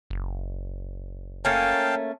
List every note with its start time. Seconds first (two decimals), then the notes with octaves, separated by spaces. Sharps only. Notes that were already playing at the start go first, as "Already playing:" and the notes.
0.10 F#1
1.45 A3 A#3 C#4 F5 G5 A5